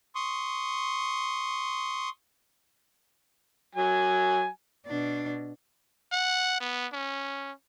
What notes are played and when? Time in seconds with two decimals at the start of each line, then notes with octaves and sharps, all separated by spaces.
0.15 C6 C#6 D#6
3.75 F#3 G#5
4.87 B2 D4
6.12 F#5
6.60 B3
6.93 C#4